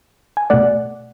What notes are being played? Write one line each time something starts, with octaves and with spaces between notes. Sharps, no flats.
G#5
B2 A3 D5 F#5